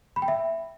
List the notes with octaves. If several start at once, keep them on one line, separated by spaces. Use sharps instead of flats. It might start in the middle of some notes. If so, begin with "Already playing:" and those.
B5
G5
E5